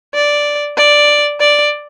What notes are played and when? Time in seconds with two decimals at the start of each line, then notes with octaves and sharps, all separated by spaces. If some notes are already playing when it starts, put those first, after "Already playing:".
0.15 D5
0.77 D5
1.40 D5